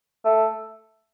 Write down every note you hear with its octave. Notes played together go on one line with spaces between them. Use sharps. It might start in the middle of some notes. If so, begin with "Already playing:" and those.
A3